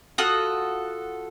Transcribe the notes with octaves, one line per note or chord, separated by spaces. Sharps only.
F4 F#4 A4 D#6